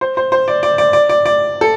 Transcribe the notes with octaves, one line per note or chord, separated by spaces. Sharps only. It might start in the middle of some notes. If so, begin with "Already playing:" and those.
C5
C5
C5
D5
D5
D5
D5
D5
D5
A4